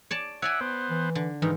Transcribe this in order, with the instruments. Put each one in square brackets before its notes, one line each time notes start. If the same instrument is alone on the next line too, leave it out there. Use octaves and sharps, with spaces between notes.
[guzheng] C#5 D5 A5
[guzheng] C#5 D5 G#5 [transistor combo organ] E5 F#5
[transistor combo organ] B3 C5
[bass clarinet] E3
[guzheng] D3
[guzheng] G#2 [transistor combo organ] D#3 [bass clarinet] E3